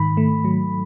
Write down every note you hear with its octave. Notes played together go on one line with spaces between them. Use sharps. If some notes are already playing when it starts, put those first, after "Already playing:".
Already playing: G#2 D#3 B5
A3
F#3